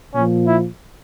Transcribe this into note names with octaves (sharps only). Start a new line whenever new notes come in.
A#2 F3 C#4
E4